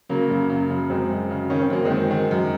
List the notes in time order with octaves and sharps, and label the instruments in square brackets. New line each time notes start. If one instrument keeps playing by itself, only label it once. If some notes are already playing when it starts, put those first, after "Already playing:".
[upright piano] C#3 F#3 A#3
F#2
C#3
F#2
F#2 G#3 C4
F#2
C#3
D#3 C#4
C4
F#2 A#3
G#3 C4
D#3
D#3
F#2